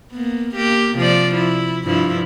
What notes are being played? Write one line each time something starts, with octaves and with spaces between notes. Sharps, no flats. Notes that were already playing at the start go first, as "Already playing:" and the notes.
A#3 B3
A#3 G4
C3 F3 D5
E4
G2 F3 E4